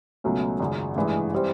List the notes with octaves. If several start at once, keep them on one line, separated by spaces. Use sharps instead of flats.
C#2 B2 F#3 A3 C#4
G#1 F#2 C#3
A1 G2 E3 G#3
E3 G3 C4